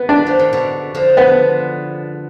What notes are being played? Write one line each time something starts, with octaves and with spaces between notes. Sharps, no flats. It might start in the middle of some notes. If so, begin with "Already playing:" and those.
Already playing: B3
D4
F3
D#3
B2 D3
D3 F3
B3